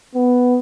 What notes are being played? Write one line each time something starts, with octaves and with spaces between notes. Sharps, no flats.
B3